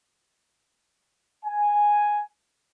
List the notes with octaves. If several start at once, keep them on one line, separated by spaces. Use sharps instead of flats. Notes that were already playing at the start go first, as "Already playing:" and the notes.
G#5